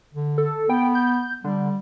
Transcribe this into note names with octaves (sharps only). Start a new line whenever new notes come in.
D3
A4
B3 G5
G6
D3 G3